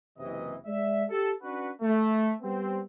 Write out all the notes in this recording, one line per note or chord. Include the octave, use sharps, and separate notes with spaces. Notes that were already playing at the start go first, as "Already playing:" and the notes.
F#1 C3 E3 D#5
G#3 D5 E5
G4 A4
C#4 D4 F#4 B4
A3
G3 B3 C4